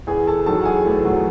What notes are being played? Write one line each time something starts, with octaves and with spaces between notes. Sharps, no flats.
E2 G#4 G#5
A4 A5
D#3 F#3 A4 A5
F#5
G#4 G#5
E2 A3 A4
F#3 F#4